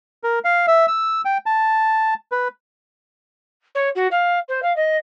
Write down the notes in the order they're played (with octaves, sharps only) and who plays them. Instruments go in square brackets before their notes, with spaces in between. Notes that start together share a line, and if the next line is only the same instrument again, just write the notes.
[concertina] A#4
F5
E5
E6
G5
A5
B4
[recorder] C#5
F#4
F5
C5
F5
D#5